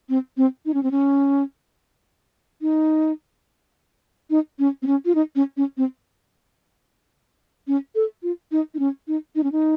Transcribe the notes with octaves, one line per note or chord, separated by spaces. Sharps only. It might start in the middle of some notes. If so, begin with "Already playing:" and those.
C4
C4
D#4
C#4
C4
C#4
D#4
D#4
C#4
C4
C#4
F4
D#4
C#4
C#4
C4
C#4
A4
F4
D#4
D#4
C#4
D#4
D#4
C#4
D#4